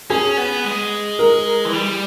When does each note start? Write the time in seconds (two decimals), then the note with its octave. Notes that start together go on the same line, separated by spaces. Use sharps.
0.10 C#4 G#4
0.37 B3
0.65 G#3
1.19 A#4
1.65 E3
1.73 G3